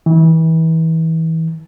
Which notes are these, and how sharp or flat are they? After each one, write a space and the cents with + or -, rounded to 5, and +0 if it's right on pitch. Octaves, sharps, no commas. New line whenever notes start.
E3 -30